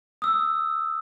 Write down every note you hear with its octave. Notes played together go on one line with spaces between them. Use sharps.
D#6 E6